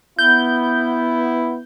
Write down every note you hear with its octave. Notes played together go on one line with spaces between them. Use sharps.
B3 E4 G6